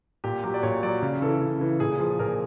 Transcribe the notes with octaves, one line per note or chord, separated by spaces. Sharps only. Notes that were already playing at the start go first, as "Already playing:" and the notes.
A#2 G4
F#3 G4
D5
A#2 C#5
F#3 D5
C#3
E3 A4
C#3
E3
A#2 G#4
F3 G#4
A#2 A#4